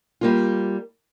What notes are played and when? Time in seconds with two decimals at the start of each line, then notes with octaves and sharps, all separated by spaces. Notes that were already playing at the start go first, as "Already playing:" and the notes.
0.21 G3 A#3 F4